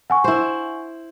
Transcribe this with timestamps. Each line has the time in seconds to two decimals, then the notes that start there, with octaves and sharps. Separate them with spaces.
0.10 F#5 G#5 C#6
0.24 E4 C5